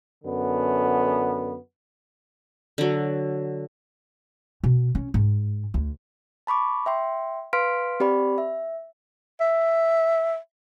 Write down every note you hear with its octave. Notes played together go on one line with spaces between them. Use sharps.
F#2 D3 B3
D3 F#3
B2
C#4
G#2
D2
A5 B5 C#6 D6
E5 G5 C6
B4 F5 C6 F6 B6 D7
C4 G4 D5 B5
E5
E5